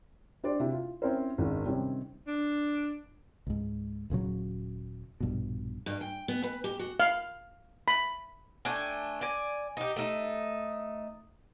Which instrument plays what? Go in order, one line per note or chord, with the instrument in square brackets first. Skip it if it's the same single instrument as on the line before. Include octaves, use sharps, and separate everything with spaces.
[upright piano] D4 G4 C5 D5
C3 E4 F#4
F4
C4 C#4 E4 A#4 C5
G#1 C#2 D#3
C3 D#3 G3 C4 C#4
[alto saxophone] D4
[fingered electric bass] C#2 G#2
D#1 A#2 C#3 F#3
A#1 G2 B2
[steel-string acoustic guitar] G2
G5
B3
B4
G4
F#4
[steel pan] F5
B5
[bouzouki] A3 D4 G5 G#5
D5 G#5
D#4 G4
A3 D#4